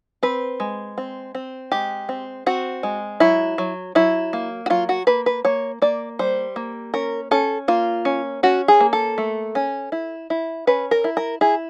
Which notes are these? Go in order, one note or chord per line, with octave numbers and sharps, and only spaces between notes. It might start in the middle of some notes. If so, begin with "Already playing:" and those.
C4 B4
G#3
C4
C4
G#3 G4
C4
C4 F#4
G#3
F#3 E4
F#3
F#3 E4
A#3
F#4
F#3 F4
F#4
A#3 B4
B4
A#3 C#5
A#3 D5
G3 C5
A#3
C#4 A#4
C#4 A4
A#3 F4
C#4
C#4 F#4
G#4
A#3
A4
A3
C#4
E4
E4
C#4 B4
A#4
E4
A#4
E4 G#4